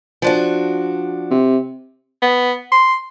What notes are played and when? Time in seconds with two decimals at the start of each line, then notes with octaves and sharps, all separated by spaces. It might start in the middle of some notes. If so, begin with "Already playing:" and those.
0.22 F3 D4 F#4
1.31 C3
2.22 B3
2.72 C6